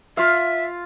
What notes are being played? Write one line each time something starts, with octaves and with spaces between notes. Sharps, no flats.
F4 E5 F5